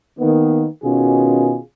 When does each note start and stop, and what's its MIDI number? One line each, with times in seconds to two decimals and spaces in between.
0.20 0.65 51
0.20 0.65 58
0.20 0.65 59
0.83 1.57 47
0.83 1.57 51
0.83 1.57 61
0.83 1.57 65
0.83 1.57 66
0.83 1.57 68